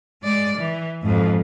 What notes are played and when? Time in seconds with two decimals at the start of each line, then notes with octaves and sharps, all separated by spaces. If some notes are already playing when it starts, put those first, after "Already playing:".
0.23 G#3 D5
0.57 E3
1.03 F2 G#2